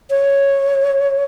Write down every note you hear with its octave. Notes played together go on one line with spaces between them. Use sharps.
C#5